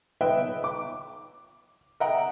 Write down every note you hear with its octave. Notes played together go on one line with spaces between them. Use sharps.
B4 D#5 E5 G5
D6
D#5 E5 F#5 G5 A#5